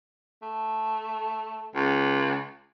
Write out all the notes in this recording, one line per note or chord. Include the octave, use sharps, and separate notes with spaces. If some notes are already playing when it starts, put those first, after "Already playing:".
A3
C#2